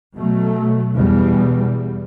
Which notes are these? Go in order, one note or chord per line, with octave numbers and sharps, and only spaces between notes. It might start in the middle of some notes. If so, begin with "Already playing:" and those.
B2 F#3 A3
E2 B2 G3